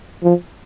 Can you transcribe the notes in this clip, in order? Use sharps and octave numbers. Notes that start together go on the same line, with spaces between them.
F3